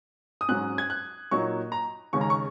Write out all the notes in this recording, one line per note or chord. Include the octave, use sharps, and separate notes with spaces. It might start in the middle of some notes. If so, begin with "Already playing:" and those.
D#6
G#2 F#3 C#4 F#6
G#6
F#6
A#2 F#3 A#3 D#4 C#6
A#5
D#2 C#3 G#3 C#4 C#6
A#5
C#6